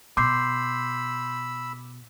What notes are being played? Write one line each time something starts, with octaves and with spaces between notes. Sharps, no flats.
B2 B5 C6 D6 E6 G6 C7